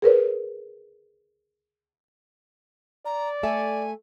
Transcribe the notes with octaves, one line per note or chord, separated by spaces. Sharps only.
G#4 A#4 B4 C#5
D5 A#5
A3 A4 E5 G#5